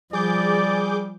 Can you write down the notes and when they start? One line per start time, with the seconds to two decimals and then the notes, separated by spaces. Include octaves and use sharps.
0.13 F3 G3 G#4 D5 D6 G6